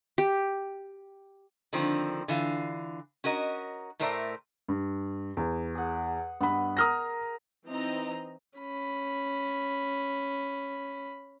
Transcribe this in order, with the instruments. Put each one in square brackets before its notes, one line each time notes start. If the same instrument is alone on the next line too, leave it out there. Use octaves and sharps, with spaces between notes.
[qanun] G4
[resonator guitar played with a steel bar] D3 D#3 F3 A#3 C4
D3 E3 F4 F5
C#4 F#4 A#4 D#5
A2 A3 A#4 C5 D5 E5
[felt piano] G2
E2
[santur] G#4 F#5
[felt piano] G2 B5 [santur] B3 D#5
[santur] A#4 G#5 [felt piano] D#6 F6 A#6
[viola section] E3 C4 D#4 D#5 A#5
[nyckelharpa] C#4 B5